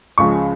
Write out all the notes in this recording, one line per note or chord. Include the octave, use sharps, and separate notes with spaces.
C#2 C#3 F3 G#3 C#6